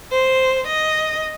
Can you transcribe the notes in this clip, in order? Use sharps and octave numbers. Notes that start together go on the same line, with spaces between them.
C5
D#5